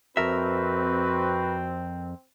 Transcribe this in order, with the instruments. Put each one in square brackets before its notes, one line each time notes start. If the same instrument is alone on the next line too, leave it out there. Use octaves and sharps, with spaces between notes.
[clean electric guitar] F2 A#4 E5 [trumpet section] C4 [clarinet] F#4 [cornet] B4